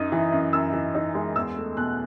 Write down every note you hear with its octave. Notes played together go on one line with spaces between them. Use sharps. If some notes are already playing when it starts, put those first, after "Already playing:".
Already playing: F#2 D#4 D#6
E3
F#2
F#2 E6
E3
D#4
G#3
E2 E6
A3
B2 F#6